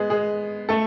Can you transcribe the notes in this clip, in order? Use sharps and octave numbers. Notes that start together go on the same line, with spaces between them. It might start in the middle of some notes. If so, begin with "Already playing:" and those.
Already playing: G#3 B3 G#4
G#3 G#4
A3 A4